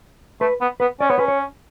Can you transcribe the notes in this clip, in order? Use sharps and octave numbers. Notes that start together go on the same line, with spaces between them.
A3 B4
B3
B3 B4
C#4 D5
B3 C#5
C#4 B4
C#5